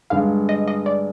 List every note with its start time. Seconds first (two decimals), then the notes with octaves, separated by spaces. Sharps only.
0.10 G2 D3 G#3 F5
0.49 D#5
0.68 D#5
0.86 D5